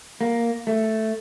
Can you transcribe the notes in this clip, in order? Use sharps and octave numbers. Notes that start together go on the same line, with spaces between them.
A#3
A3